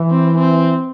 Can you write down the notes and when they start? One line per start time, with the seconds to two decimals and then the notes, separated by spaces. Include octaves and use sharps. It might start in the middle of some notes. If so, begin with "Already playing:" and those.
Already playing: E3
0.10 C4
0.38 C4